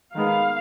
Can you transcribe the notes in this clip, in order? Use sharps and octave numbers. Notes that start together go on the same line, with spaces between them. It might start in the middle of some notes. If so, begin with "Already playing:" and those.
D#3 G#3 B3 F5